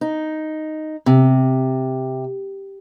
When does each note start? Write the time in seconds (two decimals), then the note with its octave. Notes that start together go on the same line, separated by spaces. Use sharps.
0.01 D#4
1.06 C3